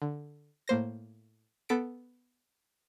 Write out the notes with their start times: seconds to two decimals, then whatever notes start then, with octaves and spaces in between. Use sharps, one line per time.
0.02 D3
0.68 A2 A#3 C5 A#6
1.69 B3 A4 B6 D7